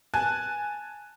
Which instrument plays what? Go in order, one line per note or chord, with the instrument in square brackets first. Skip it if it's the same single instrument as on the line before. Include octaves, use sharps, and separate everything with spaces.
[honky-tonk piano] G#5 A5 F#6